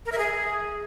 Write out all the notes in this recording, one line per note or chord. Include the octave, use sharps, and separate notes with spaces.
A#4
E5
G#4